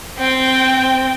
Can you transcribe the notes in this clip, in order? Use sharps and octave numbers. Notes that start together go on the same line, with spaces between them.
C4 G5